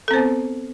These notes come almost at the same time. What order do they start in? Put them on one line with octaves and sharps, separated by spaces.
A4 C4 C5 B3